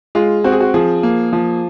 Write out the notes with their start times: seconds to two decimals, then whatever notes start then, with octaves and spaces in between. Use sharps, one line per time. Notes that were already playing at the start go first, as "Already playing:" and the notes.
0.15 G#3 F4
0.44 C4 F#4
0.52 G#4
0.60 F#4
0.74 F3 G#4
1.03 A#3
1.33 F3